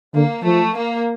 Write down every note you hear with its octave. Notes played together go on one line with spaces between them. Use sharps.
D3 A#3
F3 A3
A#3